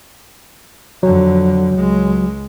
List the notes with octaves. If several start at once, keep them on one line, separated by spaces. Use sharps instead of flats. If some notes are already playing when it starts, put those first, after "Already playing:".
F2 D3 F#3
C#2 G#3